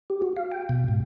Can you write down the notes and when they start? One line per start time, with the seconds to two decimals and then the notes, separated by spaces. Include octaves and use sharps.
0.10 G4
0.22 F#4
0.36 F5
0.52 G5
0.69 B2
0.88 G#2